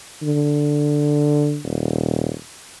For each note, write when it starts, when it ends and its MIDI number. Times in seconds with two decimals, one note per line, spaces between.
0.23 1.60 50
1.65 2.34 27